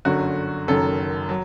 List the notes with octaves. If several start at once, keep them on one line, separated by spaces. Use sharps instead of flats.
G1 F#2 D3 F#3 F#4
F#1 F#2 D#3 F#3 A4
F#3